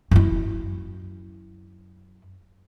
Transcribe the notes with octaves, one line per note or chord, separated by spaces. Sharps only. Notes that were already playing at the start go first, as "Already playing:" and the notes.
F#2 E4